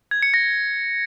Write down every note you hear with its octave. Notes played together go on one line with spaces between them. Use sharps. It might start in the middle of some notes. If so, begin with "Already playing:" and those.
G#6
C#7
A#6